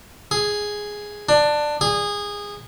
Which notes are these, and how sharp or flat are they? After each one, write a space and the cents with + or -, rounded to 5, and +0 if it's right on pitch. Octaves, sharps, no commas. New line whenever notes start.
G#4 +0
D4 +15
G#4 -20